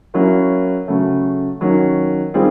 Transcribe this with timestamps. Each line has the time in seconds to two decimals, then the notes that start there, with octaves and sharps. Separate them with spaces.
0.14 F#3 A#3 C#4 E4
0.88 C#3 F#3 A3
1.61 D#3 F#3 A#3 C#4
2.34 D#3 G3 C4 F4 G#4